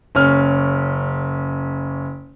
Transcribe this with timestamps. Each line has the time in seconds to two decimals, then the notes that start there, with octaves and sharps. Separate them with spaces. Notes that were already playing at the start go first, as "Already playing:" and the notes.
0.15 F#1 C#4 F6